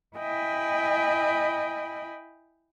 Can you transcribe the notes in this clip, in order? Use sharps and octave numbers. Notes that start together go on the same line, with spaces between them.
E4 D#5 G5 G#5 B5